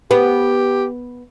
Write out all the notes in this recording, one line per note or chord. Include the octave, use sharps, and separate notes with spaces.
B3 G4